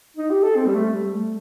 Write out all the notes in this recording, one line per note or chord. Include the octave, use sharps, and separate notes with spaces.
D#4
G4
A4
C4
G3
A3
G3
A3